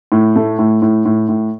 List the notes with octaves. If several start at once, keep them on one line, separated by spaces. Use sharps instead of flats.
A2
A3
A2
A2
A2
A2